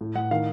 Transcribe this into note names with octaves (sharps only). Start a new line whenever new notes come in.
A2
A2 F#5
D#3 F5